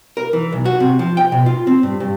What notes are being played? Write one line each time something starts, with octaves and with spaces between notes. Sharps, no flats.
A#4
E3
B1
F#4
C3
F3
G5
B2
F4
C4
G2
G2